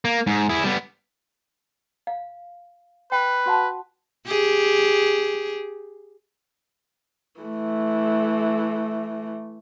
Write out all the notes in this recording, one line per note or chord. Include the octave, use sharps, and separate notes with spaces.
A#3
G#2
E4 G#4
G3 B3
F5
B4 G5
F#4 F#5 A5
G4 G#4
E3 A3